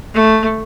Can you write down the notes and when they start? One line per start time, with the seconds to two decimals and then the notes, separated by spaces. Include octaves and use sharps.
0.14 A3